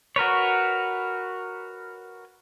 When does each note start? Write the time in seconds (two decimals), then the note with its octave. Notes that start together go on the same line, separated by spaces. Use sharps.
0.16 F#4 A#4 B4 C#5